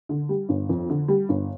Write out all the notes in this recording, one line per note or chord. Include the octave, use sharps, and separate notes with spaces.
D3
G3
G1
F2
D3
G3
G1